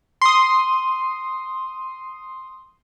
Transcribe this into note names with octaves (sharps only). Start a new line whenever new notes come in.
C6 D#6